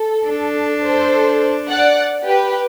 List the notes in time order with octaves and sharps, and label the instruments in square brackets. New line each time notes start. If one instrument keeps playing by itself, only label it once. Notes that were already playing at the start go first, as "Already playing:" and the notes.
Already playing: [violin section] A4
[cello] D4
[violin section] A4 C5
D5 F#5
G4 B4